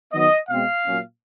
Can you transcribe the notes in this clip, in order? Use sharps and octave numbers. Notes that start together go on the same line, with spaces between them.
D#3 F#3 B3 D#5
B2 G#3 C4 F5
A#2 F#3 A#3 C#4